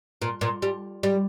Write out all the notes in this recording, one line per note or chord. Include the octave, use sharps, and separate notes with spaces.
A#2
A#2
G3
G3